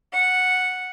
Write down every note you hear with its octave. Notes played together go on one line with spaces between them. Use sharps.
F#5